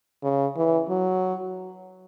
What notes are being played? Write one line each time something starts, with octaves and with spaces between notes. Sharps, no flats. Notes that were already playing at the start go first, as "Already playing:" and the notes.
C#3
E3
F#3